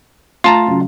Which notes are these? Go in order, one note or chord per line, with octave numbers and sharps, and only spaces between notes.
A3 F4 A5 A#5
C#3 F#3 C#4